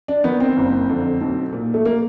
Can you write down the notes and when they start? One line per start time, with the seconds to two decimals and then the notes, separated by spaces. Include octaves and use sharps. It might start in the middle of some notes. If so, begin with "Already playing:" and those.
0.08 D4
0.24 D#3 B3
0.40 C4
0.57 F#1
0.89 F2 D3
1.21 B1
1.53 A#2
1.74 A3
1.85 A#3